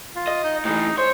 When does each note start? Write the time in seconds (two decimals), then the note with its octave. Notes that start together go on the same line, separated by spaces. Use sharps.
0.16 F4
0.27 D#5
0.44 D#4
0.65 A2 E3 D#4
0.98 C5 C#5